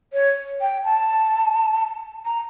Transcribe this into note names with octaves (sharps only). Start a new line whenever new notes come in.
C#5
G5
A5
A#5